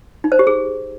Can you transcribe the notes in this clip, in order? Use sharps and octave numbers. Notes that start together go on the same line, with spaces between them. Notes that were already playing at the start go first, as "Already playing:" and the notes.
D#4
C5
G4
G#4